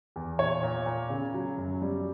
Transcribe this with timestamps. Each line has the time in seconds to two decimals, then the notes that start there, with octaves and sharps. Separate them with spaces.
0.16 E2
0.39 A#2 C#5
0.63 A#2
0.86 A#2
1.10 C#3
1.34 F#3
1.58 F#2
1.82 G3